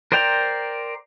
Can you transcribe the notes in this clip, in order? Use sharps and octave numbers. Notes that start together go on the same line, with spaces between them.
A#4 C5 D5 G5 A#5